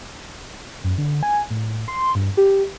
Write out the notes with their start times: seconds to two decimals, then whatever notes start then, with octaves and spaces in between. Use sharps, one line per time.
0.84 F#2
0.98 D3
1.23 G#5
1.50 A2
1.88 C6
2.15 G2
2.37 G4